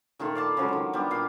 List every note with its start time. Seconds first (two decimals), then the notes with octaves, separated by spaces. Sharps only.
0.19 A#2 D#3 A3 F4
0.35 D5 F5 A5 B5
0.57 C#3 F3 F#3 G#3
0.68 D3 D#3
0.93 G3 B3 D4 F4
1.11 A#2 F5 D6